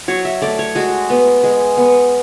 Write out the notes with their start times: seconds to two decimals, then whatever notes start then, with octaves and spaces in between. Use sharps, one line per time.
0.08 F#3 C#5
0.25 E5
0.41 A3 D5
0.59 C#5
0.75 G#3 F#4
1.10 B3
1.44 G#3
1.77 B3